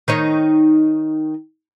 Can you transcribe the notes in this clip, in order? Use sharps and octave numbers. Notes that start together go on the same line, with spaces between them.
D#3 D#4 C#5